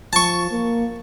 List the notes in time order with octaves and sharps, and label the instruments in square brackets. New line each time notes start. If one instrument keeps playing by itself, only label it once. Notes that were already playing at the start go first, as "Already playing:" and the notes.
[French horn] F3 [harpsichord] A5 C#6
[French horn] A#3